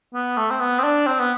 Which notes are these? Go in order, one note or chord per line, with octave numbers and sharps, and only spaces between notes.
B3
A3
C4
B3
C4
D4
C4
B3